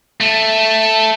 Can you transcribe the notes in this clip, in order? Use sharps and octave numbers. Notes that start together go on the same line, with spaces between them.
A3